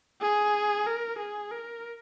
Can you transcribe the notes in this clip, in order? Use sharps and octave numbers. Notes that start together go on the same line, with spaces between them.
G#4
A#4
G#4
A#4